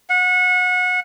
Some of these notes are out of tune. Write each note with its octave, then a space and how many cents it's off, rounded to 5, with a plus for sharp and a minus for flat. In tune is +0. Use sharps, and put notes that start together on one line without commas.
F#5 -25